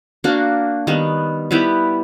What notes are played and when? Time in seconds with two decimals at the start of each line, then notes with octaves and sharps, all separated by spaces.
0.24 A#3 D4 F#4
0.87 D#3 G3 B3
1.51 G3 B3 E4 G4